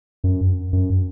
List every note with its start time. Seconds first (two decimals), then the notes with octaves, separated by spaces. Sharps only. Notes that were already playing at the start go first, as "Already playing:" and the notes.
0.24 F#2
0.73 F#2